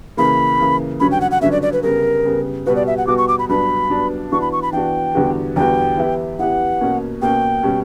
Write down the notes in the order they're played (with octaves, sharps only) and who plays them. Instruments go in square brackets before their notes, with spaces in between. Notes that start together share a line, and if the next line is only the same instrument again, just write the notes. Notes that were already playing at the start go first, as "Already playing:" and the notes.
[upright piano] C#3 E3 A#3 [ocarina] B5
[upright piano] C#3 E3 A#3
[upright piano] G2 D3 F#3 C#4 [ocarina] B5
[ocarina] G5
F#5
F#5
[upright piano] G2 D3 F#3 C#4 [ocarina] E5
[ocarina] D5
D5
B4
[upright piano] C#3 G3 B3 [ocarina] A#4
[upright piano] C#3 G3 B3
[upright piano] B2 G3 B3 F#4 [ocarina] B4
[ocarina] D5
E5
F#5
[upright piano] B2 G3 B3 F#4 [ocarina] D6
[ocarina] C#6
D6
B5
[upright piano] G2 F#3 B3 D4 [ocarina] B5
[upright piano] G2 F#3 B3 D4
[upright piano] E3 B3 D4 F#4 [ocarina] C#6
[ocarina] B5
C#6
B5
[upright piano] E3 B3 D4 F#4 [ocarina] G5
[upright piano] E2 D3 G3 B3 F#4
[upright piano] E2 D3 G3 B3 F#4 [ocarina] G5
[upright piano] E3 B3 E4 G4
[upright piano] E3 B3 E4 G4 [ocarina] F#5
[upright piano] B2 A#3 C#4
[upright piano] B2 A#3 C#4 [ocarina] G5
[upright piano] B2 G3 C#4